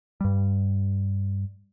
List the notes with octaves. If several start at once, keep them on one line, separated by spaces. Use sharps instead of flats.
G2 G3